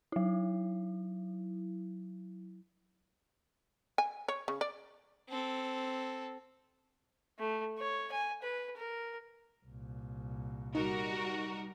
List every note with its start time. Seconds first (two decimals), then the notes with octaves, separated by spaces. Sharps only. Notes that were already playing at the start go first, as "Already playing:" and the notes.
0.12 F#3 E4
3.98 G#5
4.28 C#5
4.48 C#3
4.61 D5
5.29 C4 A4
7.39 A3
7.78 C#5
8.12 G#5
8.43 B4
8.77 A#4
9.66 C2 A#2
10.75 G3 D#4 F#4 A#4